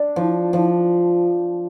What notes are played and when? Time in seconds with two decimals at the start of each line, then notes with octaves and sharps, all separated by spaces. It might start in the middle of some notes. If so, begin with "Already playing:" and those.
Already playing: D4
0.16 F3
0.53 F3